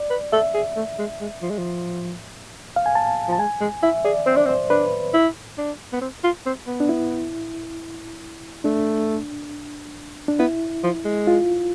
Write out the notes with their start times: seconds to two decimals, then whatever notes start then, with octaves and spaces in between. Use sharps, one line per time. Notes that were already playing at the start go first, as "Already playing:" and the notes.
Already playing: D5
0.10 B4
0.32 A4 E5
0.55 G#4
0.76 A3
0.99 G#3
1.21 G#3
1.42 F3
1.50 G#3
1.58 F3
2.76 F5
2.86 G#5
2.95 A5
3.28 F3 A5
3.39 G#3 G#5
3.61 G#3
3.83 E4 E5
4.05 G#4 D5
4.26 C4 C5
4.36 D4 D5
4.45 C4
4.49 C5
4.70 D4 B4
5.14 E4
5.58 D4
5.93 B3
6.01 C4
6.24 F4
6.46 C4
6.67 B3
6.80 D4
6.89 E4
8.64 A3 D4
10.28 D4
10.39 B3 E4
10.83 F3
11.05 G#3
11.27 F4